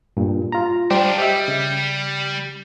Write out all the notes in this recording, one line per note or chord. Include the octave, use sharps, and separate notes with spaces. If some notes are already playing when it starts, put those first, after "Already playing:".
G2 A#2
F4 A#5
G3 D4 F4 G4 C5
G3 G4 D#5 E5
C#3